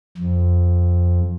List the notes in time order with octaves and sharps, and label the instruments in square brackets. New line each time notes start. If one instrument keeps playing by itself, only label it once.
[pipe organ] F2